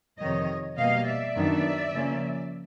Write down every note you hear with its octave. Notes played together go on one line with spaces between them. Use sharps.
F2 C3 D#3 C#5 D#5
B2 G3 A#3 D#5 F5
D5 E5
F#2 D#3 F#3 B3 D4
C#3 F3 A#3 C#4